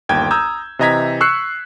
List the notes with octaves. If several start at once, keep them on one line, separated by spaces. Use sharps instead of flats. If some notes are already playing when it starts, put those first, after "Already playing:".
G1 D#2 G5 G#6
A#5 D#6 E6 G6 G#6
C3 E3 D#5 A#5 G#6 B6
C#6 E6 F#6 C7 C#7